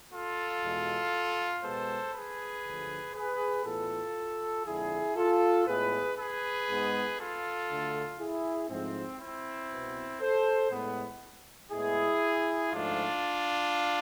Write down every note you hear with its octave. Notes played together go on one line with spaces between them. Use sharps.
F4 A4
E2 B2 G#3
B2 G#3 B3 A4 C5
G#4 B4
D2 D3 F3
G#4 B4
A2 E3 B3 F4 A4
F2 D3 G#3 E4 G#4
F4 A4
A2 G#3 B3 G#4 B4
G#4 B4
G#2 G#3 B3
F4 A4
D2 D3 A3
E4 G#4
G#2 F3 A3 C4
C4 E4
C2 B2 B3
A4 C5
A2 G#3 B3
A2 G#3 B3 E4 G#4
G#2 F3 A3 D4 F4